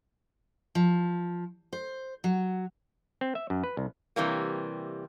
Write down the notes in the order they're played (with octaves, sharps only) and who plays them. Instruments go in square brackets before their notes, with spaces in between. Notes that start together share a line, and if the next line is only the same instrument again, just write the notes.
[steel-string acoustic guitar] F3
C5
F#3
[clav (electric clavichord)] C4
E5
F#2
B4
C2
[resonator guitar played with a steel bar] C3 E3 G3 A#3